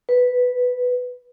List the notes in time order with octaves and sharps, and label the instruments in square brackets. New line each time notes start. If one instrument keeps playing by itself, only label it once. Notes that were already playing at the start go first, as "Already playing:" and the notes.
[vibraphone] B4